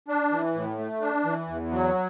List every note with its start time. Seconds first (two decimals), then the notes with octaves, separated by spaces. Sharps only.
0.08 D4
0.32 E3
0.55 A2
0.78 A3
1.01 D4
1.25 E3
1.48 E2
1.71 F#3